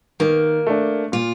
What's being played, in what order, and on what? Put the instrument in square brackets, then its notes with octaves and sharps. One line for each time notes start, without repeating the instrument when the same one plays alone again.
[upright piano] D#3 [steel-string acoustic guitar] A#3
[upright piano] A3 D4
[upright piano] A#2 [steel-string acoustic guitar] F4